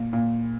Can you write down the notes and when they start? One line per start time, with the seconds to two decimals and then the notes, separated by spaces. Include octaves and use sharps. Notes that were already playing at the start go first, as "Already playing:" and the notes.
Already playing: A#2
0.13 A#2